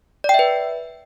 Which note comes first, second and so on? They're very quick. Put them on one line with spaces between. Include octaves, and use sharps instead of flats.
D5 G5 E5 B4